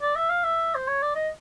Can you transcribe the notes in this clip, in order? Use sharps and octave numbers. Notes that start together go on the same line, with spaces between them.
D5
E5
F5
E5
C5
C#5
D5
D#5